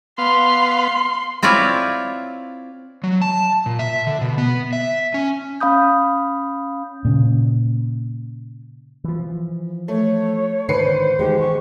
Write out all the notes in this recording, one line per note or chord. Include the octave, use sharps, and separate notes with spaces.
B3 F5 C6
C4 E4 F4 C#5 D5
F#3
A5
A#2
E5
D3
B2
B3
E5
C#4
C#4 F5 B5 D#6 G6
A#2 C#3
E3 F3
A3 C#5
G#2 D3 D#3 B4 C5 C7 C#7
E2 D#3 G#3 G4
C#6